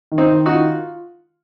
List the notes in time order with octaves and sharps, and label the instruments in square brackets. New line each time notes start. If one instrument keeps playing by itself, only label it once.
[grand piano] D#3
[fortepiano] C4 D#4
[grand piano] D#3
[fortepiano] D#4 F#4
[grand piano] F4